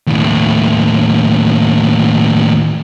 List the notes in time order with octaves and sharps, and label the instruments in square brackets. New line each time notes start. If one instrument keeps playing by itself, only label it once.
[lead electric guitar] D#2 A2